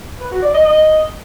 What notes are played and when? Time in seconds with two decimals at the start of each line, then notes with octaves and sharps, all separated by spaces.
0.20 B4
0.31 F#4
0.43 D5
0.54 D#5
0.65 D#5